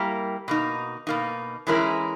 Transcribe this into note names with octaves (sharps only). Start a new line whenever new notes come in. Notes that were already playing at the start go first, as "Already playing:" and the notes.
Already playing: G3 A#3 E4 A#4
B2 A#3 D#4
B2 A#3 D#4
E3 G#3 C#4 E4 A#4